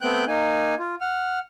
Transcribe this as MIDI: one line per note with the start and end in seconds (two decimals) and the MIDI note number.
0.01 0.25 57
0.01 0.25 59
0.01 0.25 60
0.01 0.25 79
0.01 0.25 90
0.01 0.25 91
0.27 0.75 58
0.27 0.75 63
0.27 0.75 80
0.80 0.95 65
1.01 1.39 78
1.01 1.39 89